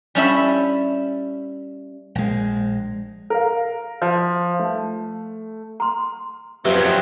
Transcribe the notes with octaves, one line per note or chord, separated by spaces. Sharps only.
G3 C#4 E4 E5
A#1 G#3
A#4 F5
F3
A3
A#5 C6
F2 F3 F#3 G4 B4 E5 E6